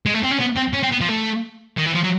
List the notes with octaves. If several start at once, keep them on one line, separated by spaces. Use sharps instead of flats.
G#3
A3
C4
C#4
B3
C4
C#4
C4
B3
F3
A3
D#3
E3
F3
F#3